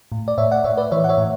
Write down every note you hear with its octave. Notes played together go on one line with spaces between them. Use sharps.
A2
D5
A2 C#5 E5
D5 F#5
A2 C#5 E5
B4 D5
E3 C#5 E5
F#5
C#5 E5
A2